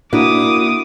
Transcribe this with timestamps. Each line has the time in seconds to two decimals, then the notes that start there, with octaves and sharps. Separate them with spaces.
0.13 A#3 D4 E4 F#4 D6 D#6